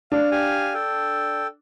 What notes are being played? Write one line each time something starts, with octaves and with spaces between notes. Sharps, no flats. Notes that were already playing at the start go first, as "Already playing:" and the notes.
D4 F5
G4 F5 G#5
A4 G5